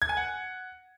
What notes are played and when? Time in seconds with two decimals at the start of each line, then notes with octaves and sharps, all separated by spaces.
0.02 G#6
0.09 G#5
0.17 F#5